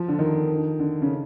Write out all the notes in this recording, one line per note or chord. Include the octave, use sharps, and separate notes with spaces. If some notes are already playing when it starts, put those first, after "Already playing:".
Already playing: F3
D3
D#3
D3
C#3